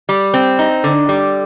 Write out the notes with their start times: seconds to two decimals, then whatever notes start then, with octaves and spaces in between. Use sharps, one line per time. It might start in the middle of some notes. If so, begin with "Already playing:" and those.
0.09 G3
0.34 C4
0.59 D#4
0.84 D3
1.09 G3